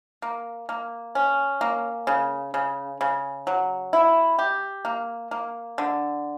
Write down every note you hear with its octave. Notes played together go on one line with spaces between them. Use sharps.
A#3
A#3
C#4
A#3
C#3
C#3
C#3
F#3
E4
G4
A#3
A#3
D3